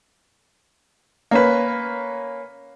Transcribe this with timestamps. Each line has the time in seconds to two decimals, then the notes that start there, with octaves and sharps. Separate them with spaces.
1.31 A#3 C#4 B4